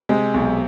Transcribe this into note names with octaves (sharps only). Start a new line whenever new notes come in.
C3 G#3
B1